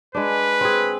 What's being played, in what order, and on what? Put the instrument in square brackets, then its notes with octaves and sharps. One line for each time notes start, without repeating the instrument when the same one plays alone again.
[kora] G#3 D4 [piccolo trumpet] B4
[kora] C4 G#4